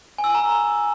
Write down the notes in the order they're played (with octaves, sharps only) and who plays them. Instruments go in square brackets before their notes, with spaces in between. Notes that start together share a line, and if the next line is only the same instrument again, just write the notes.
[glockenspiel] G#5
E6
G#5
A#5